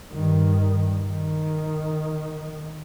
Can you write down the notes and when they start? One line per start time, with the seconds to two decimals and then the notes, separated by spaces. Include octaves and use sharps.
0.12 G2 D#3
1.04 D#3